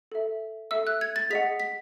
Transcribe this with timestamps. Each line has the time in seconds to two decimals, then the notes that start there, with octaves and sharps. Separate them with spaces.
0.12 A4 E5
0.71 A4 E5 E6
0.87 F#6
1.01 G#6
1.16 A6
1.30 G#4 D#5 F#5 B6
1.60 B6